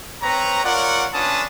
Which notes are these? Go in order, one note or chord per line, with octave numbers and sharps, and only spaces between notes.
C4 B4 C#5 A#5
F4 A#4 C#5 D5 F#5
C#4 D4 F4 B4 A5 D#6